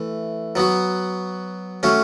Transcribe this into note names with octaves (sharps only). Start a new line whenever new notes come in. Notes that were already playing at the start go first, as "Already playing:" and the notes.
Already playing: E3 A3
F#3 B3 F#4
A3 C#4 F#4